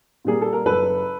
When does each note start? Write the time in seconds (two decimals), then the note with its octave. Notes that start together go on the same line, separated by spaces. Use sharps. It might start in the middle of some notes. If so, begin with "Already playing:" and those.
0.25 A#2 G3 A#3 G#4
0.41 A4
0.53 A#4
0.65 F#1 A4 B4